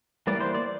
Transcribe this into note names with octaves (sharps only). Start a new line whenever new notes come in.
E3 G3 A#3 D5
C5
D5